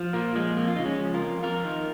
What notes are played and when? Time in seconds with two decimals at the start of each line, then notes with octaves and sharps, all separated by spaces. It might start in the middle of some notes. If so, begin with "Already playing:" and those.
Already playing: F3
0.13 A#2 A#3
0.35 F3 G#3
0.57 F2 A#3
0.67 F4
0.76 C#3 D#4
0.85 G#3 C#4
1.00 F3
1.14 F4 A#4
1.21 F2
1.43 F2 F4 A#4
1.64 D#3